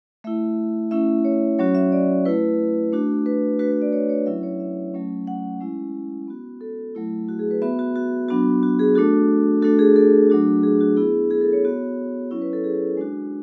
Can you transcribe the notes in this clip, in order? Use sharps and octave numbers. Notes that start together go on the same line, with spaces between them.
A3 E4 E5
A3 C#4 E4 E5
C#5
F#3 C#4 F#4 C#5
E5
D5
A3 E4 B4
A3 D4 F#4
B4
A3 D4 F#4 B4
B4
D5
C#5
C#5
F#3 C#4 E4 E5
C#5
E5
F#3 A3 C#4
F#5
G#3 C#4 E4
B3 F#4
A4
F#3 A3 E4
F#4
G#4
B4
B3 F#4 E5
F#4
F#4
F#3 B3 D4 F#4
F#4
G#4
A3 D4 F#4 A4
A3 D4 F#4 A4
G#4
A4
F#3 A3 D4 F#4
G#4
F#4
B3 E4 G#4
G#4
A4
C#5
B3 F#4
F#3 C#4 E4 C#5
B4
A4
G#4
G#3 D4 F#4